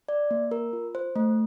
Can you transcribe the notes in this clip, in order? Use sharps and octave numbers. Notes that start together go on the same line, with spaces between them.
D5
A#3
A#4
F4
C5
A3